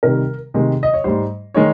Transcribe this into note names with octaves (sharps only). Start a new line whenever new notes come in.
C3 D#3 G3 A#4
C3 D#3 G#3
D#5
C#5
G#2 G3 C5
D#3 G#3 C#5